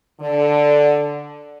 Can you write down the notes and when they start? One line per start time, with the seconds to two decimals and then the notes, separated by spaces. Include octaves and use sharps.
0.21 D3 D5